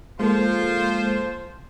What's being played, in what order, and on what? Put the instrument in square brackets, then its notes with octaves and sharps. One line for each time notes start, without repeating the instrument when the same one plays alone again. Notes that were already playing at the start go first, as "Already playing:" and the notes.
[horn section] F3 F4 C5 [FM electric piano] G#3 A#3 A4